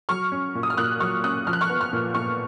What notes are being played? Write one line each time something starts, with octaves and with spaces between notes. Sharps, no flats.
F#3 C#6 F6
C#4
A#2
D#6
F6
A#2 D#6 F#6
F#3 C#6 F6
C#4 D#6 F#6
F3 F6
F#6
C#6 F6
B3
C#6 F6
A#2
A#2 C#6 F6